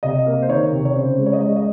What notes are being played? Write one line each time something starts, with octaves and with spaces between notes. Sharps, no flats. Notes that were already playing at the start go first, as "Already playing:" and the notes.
C3 D#5
A#3
C5
D#3 C#5
C3
C#5
C#3 C5
G#3
C#5
D#5
G#3 C#5
D#5